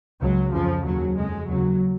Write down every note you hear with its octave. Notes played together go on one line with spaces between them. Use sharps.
C#2 C#3 F#3
F2 C#3 F3
D#2 C#3 F#3
F2 C#3 G#3
D#2 C#3 F#3